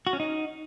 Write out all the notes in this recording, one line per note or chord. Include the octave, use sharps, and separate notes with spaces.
F#4
C#4
D#4